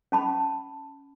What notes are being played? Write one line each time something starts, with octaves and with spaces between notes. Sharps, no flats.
C#4 A5 B5